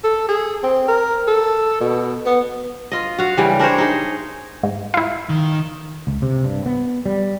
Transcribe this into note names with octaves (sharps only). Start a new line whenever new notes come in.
A4
G#4
C4
A#4
A4
B2
B3
F4 D#5
F#4 F5
C#3 E3 G3
D4 A#4 C5 C#5
D#4 G#4
G#2
E4 F4
D#3
C#2
C3
G2
B3
G3